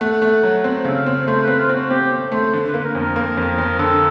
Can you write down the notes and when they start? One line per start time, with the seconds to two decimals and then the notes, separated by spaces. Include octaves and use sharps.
0.01 A3 F#5
0.22 A3
0.43 F#3
0.64 C4
0.85 C#3 E5
0.95 F5
1.06 C4
1.27 A3 C5
1.43 C4 B4
1.59 F4
1.69 C4
1.74 F#4
1.90 C4 G4
2.12 C4
2.32 A3 C5
2.53 D3
2.69 B4
2.74 A#3
2.80 B4
2.84 A#4
2.95 F2
3.01 A#4
3.16 A#3
3.37 F2
3.58 F2
3.79 D3 A4